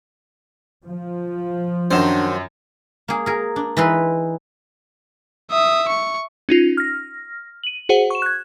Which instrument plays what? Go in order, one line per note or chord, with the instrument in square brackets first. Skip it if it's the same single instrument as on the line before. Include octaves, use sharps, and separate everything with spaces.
[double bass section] F3
[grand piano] F#2 E7 [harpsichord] D#3 F#3 C5 [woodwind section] D4
[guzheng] A#3 G#4
G#4 A#4
D4
E3 D#4 E4 B4 C6
[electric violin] E5 D#6
C#6
[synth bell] C#4 D#4 F4
F6 A#6
D#7 F#7
F#4 G#4 C5 F#5
C#6 E7
F#6 G#6